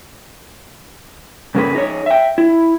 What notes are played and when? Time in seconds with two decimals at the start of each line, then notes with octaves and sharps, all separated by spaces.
1.55 G2 C#3 A3 A#3 G#4 B4
1.75 D#4 G#4 C#5
2.06 E5 G5
2.38 E4